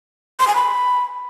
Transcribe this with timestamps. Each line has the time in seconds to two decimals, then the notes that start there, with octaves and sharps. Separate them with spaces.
0.40 C6
0.48 G#5
0.55 B5